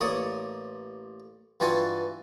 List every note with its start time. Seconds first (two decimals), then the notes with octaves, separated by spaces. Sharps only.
0.01 A1 A#3 C#5 D5 D#6
1.60 G2 E3 F4 F#4 G#5 A5